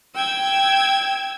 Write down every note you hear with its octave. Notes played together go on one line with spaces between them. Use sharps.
G5 E6 G#6